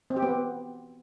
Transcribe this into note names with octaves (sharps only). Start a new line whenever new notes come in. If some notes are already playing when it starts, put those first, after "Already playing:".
C4
G4
B3